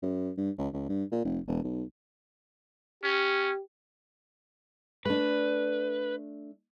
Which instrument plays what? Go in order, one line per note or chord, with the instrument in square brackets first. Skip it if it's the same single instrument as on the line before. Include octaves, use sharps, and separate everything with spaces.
[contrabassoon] F#2
G2
C#2
C#2
G2
A#2
F1
E1
B1
[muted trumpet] C#4 [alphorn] G4
[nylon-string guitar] A3 D4 [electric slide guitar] B4